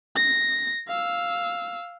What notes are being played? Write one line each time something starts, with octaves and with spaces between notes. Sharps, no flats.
A#6
F5 E6